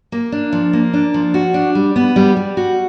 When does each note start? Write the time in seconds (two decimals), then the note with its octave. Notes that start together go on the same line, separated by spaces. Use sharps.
0.12 A#3
0.32 D4
0.53 F3
0.73 A#3
0.93 D4
1.14 F3
1.34 F#4
1.54 D4
1.75 G3
1.96 B3
2.16 G3
2.37 G3
2.57 F#4